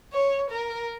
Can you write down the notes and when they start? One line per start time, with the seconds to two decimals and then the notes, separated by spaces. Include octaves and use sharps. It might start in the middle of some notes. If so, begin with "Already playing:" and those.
0.13 C#5
0.50 A#4